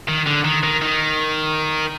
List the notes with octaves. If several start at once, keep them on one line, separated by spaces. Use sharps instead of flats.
D#3
D3
D#3
D#3
D#3